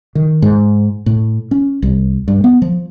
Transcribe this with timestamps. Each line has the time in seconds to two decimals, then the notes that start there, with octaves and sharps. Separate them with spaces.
0.15 D#3
0.42 G#2
1.06 A2
1.51 C#4
1.82 C2
2.28 G2
2.44 B3
2.62 F3